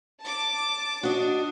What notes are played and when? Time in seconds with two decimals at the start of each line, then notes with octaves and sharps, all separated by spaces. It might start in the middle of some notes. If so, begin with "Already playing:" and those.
0.21 A5 D6
1.03 D4 F#4 D#5